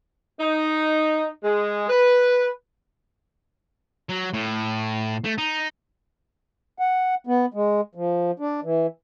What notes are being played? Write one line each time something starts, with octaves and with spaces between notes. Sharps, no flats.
D#4
G#3
B4
F#3
A2
A3
D#4
F#5
B3
G#3
F3
D4
E3